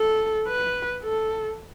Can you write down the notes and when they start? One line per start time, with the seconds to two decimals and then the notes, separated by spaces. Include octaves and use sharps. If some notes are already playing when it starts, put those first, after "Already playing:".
Already playing: A4
0.48 B4
1.03 A4